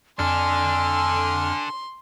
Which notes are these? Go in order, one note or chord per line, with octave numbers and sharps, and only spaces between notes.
F2 D4 A4 G#5 C6 F6